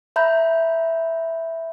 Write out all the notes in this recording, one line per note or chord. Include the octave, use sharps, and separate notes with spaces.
E5 A#5 B5 G6